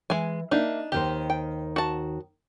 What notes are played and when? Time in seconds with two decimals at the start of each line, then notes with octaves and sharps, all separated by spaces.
0.10 E3 G#3 G#5
0.51 A#3 D4 D#4 E5 F5
0.92 D#2 D#3 G4 C5
1.30 G5
1.76 F#4 A5